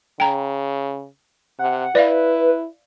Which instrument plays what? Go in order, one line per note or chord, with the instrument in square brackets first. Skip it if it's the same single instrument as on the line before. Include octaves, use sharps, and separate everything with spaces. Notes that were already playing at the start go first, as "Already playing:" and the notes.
[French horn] C#3 [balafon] G5 A#5
[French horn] C3 [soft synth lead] F#5
[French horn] E4 [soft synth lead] B4 [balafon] D5 E5 F5